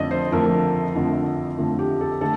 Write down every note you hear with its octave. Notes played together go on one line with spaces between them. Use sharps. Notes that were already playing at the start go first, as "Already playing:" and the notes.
Already playing: F2 D3 F3 A3 D5 D#5
C5
F2 D3 F3 A3 A#4
F2 D3 F3 A3
F2 D3 F3 A3
G4
A4
D3 A3 A4